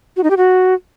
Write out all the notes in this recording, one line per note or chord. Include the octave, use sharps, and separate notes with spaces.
F#4
D#4
G4
F#4